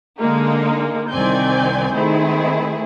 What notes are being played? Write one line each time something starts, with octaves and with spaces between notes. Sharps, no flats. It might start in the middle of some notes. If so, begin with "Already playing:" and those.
D3 G#3 A#3 D#4
C2 D#3 C4 D5 G#5 G6
D#3 A3 C4 E4 G#4